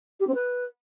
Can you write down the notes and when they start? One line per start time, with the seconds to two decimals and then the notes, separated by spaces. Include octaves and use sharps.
0.20 G4
0.27 C4
0.34 B4